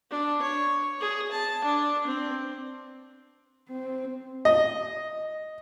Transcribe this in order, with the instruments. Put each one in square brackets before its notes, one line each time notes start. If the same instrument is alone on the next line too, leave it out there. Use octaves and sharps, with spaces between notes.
[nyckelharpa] D4
C#5
G#4
A5
D4
C4
[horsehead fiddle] C4
[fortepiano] D#5